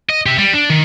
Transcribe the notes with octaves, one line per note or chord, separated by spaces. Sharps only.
D#5
G4 E5
G3
D4
D#3